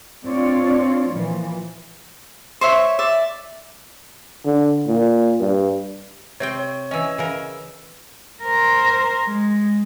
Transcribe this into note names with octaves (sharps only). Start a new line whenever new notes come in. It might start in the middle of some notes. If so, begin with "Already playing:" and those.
C4 D4 F4 C#5 D5
A#2 E3 F3
C5 C#5 E5
D5 E5
D3
A#2
G2
C3 C4 C#5 G5
C#5
E3 C#4 D#5 G#5 E6
C#3 E3 A#4
A#4 C5
G#3